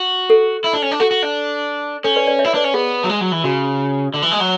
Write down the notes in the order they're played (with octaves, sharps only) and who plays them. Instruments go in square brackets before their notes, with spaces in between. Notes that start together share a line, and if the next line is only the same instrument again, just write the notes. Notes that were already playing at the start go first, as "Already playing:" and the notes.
Already playing: [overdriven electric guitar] F#4
[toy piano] A4
[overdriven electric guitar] E4
D4
C#4
D4
[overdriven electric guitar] F#4 [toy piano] A4
[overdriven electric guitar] F#4
D4
[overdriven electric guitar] C#4 [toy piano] A4 C#5
[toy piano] B4 D5
B4 D5
C#5 E5
[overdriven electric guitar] E4
[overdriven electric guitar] D4 [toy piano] B4 D5
[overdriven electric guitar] C#4
[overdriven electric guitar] B3 [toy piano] G#4
[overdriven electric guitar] F#3
G#3
F#3
E3
[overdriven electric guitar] C#3 [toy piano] F#4
[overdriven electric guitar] D3
E3
G#3
F#3